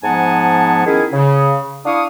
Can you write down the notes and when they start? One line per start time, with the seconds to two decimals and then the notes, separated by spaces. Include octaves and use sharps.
0.04 G#2 F3 B3 F#5 G#5 A5
0.86 D#3 C#4 E4 G#4
1.13 C#3
1.86 D4 E4 F5 C#6 D#6